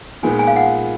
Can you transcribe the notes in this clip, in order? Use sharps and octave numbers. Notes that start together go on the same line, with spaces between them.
A#2 F3 G#3 B3 D#4 G#5
G#5
F5
F#5